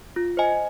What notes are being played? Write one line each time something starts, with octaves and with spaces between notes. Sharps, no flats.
F4
C5 D#5 G#5